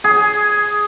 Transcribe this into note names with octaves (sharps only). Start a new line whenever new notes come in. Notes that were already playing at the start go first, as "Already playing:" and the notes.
G#4